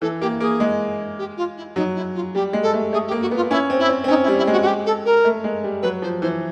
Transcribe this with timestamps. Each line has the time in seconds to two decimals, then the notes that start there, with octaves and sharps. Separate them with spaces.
0.02 E3 A4
0.21 A#3 G4
0.40 A#3 G#4
0.60 G#3
1.19 G4
1.37 F4
1.57 E4
1.76 F#3 D#4
1.96 E4
2.15 F4
2.34 G3 G4
2.53 G#3
2.63 A4
2.74 A3
2.93 A3 G#4
3.07 G4
3.11 A#3
3.21 F#4
3.31 B3
3.36 F4
3.50 C#4 E4
3.70 C4
3.79 E4
3.89 C4
4.04 C4
4.08 C#4 D#4
4.23 E4
4.28 G3
4.38 E4
4.47 G#3 F#4
4.62 F#4
4.66 G4
4.86 A4
5.05 A#4
5.25 A3
5.44 G#3
5.64 G3
5.82 F#3 B4
6.02 F3 C5
6.22 E3 C5